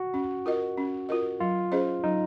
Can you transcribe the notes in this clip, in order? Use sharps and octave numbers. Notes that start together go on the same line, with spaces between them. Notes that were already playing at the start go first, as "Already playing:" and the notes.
Already playing: F#4
C#4
F4 A#4 D#5
C#4
F4 A#4 D#5
F#3 F4
C#4 G#4 C5 D#5
F#3 D#4